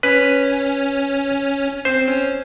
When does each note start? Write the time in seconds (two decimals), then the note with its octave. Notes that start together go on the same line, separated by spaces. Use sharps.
0.03 C#4 B4
1.85 C4 C5
2.08 C#4